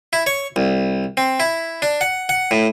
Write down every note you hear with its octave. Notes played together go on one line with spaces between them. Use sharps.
E4
C#5
C2
C4
E4
D4
F#5
F#5
A2